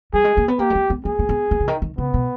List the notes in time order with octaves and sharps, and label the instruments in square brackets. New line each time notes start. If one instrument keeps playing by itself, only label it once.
[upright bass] G3 [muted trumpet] G#4
[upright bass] G#3
A#3
B3
[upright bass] A#3 [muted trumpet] G4
[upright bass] G#3
A#3
B3
[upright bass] A#3 [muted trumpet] G#4
[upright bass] A#3
B3
A#3
C#3
D#3
D#3
[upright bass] C#3 [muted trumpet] B3
[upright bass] B2